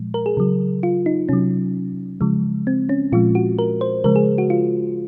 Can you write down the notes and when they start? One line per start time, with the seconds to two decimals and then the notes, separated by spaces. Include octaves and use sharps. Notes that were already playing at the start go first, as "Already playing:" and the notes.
Already playing: A#2 F3 G#3
0.14 A#4
0.26 G#4
0.37 C#3 F#3
0.83 F4
1.06 D#4
1.29 C3 F#3 C#4
2.21 C#3 F3 G#3
2.67 C4
2.89 C#4
3.12 A#2 F3 G#3 F4
3.35 F#4
3.59 A#4
3.81 C5
4.04 C#3 F3 G#3 A#4
4.16 G#4
4.38 F#4
4.50 F4